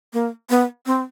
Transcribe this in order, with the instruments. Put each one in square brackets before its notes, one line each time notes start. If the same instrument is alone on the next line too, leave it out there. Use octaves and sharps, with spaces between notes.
[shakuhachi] A#3
B3
C4